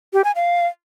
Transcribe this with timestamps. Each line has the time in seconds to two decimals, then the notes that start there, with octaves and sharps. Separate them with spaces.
0.13 G4
0.24 G#5
0.35 F5